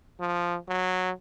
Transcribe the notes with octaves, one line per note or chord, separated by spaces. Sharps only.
F3
F#3